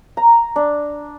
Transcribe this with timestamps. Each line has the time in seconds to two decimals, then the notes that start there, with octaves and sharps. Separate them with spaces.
0.17 A#5
0.56 D4